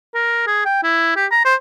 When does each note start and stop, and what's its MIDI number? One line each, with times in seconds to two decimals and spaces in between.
0.15 0.45 70
0.47 0.63 68
0.65 0.82 79
0.83 1.14 64
1.16 1.26 67
1.31 1.42 82
1.45 1.55 72